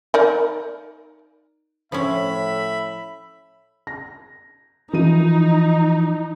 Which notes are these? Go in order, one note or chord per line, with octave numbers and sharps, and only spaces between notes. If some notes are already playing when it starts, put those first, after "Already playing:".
D#4 A#4 D5
A2 F3 C#4 E5 B5
A#6
E3 F3 D#4 D#7